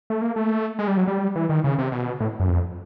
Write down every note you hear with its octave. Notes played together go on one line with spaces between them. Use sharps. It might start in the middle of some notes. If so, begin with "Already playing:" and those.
A3
A#3
A3
G#3
G3
F#3
G3
E3
D#3
C#3
C3
B2
A2
F#2
F2